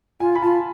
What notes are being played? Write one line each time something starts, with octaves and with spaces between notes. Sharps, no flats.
F4 G#5
B5
F4 A5